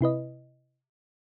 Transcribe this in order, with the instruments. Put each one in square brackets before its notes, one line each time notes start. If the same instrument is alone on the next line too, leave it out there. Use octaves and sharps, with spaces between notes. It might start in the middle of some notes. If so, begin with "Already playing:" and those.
[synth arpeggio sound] C3 E4 B4 D#5